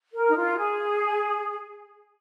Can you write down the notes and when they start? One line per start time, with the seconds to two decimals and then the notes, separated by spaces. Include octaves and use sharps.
0.13 A#4
0.28 D#4
0.35 F4
0.56 G#4